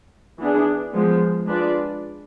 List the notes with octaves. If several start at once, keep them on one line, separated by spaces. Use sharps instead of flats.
E3 B3 D4 G#4
F3 G#3 B3
G#3 D4 F4 B4 D5